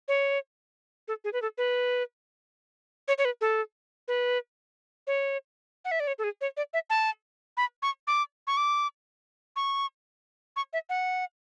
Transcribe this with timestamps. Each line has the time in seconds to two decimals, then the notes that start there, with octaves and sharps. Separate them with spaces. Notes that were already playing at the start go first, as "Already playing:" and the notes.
0.08 C#5
1.08 A4
1.24 G#4
1.33 B4
1.42 A4
1.58 B4
3.08 C#5
3.18 C#5
3.25 B4
3.41 A4
4.08 B4
5.07 C#5
5.85 F#5
5.91 E5
6.00 D5
6.07 C#5
6.19 A4
6.24 G#4
6.41 C#5
6.57 D5
6.74 E5
6.90 A5
7.57 B5
7.82 C#6
8.07 D6
8.47 C#6
8.57 D6
9.56 C#6
10.56 C#6
10.73 E5
10.89 F#5